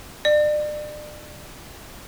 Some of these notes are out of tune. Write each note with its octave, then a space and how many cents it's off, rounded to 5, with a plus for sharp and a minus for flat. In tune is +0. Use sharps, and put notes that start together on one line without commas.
D5 +35